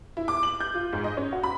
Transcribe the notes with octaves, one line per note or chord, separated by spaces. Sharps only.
E4
D6
F#7
G6
F4
G#2
D#5
C#4
F#4
B5